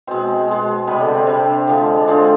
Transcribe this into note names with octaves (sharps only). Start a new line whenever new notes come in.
B2 G#3 C4 C5
B2 G#3
C3 G3 B3 B4
D3 D4
C4
C3 G3
D3 F3 G#3
D4
D3 F3 G#3 C4